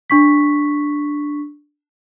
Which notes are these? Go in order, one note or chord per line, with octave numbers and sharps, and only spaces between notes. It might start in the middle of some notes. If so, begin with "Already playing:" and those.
D4 C#6 B6